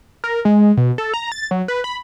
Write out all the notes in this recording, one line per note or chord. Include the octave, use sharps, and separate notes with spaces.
A#4
G#3
B2
A4
A#5
A6
F#3
B4
B5